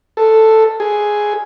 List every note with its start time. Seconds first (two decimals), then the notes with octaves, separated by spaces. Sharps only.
0.17 A4
0.80 G#4